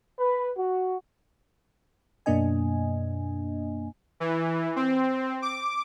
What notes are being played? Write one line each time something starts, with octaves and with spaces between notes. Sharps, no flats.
B4
F#4
F#2 B2 A#3 D4 D#5 G#5
E3
C4
D6